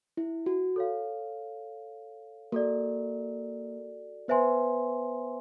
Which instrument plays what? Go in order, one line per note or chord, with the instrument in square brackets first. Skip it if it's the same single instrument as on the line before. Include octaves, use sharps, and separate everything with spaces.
[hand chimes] E4
F#4
[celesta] A4 C#5 F5
[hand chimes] A#3 A#4 [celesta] F#4 A4 D5
[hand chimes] B3 B4 [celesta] C5 E5 G#5 C6